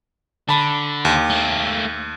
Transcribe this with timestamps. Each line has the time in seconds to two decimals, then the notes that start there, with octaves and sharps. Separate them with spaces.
0.49 D3 A5 B5
1.05 D#2
1.30 A3 A#3